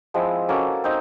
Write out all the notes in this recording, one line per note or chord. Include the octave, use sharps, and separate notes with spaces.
F3 G#3 C4 E4
A#3 C#4 F#4 A4
C4 D#4